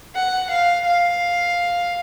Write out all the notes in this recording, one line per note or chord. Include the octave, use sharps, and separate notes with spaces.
F#5
F5
F5